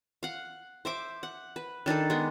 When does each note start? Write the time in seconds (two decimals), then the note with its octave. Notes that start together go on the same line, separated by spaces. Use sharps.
0.23 F5 F#5
0.85 C5 E5 D6
1.23 F#5
1.56 B4
1.86 D#3 D4 D#4 A4
2.10 G#3 B3